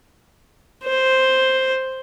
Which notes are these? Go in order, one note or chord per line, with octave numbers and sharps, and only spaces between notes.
C5